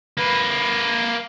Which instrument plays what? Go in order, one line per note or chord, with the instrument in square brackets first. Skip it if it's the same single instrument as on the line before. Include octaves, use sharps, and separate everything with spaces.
[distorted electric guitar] A#3 B4